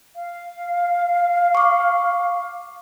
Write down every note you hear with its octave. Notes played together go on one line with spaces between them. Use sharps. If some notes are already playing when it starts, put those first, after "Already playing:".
F5
C#6 D6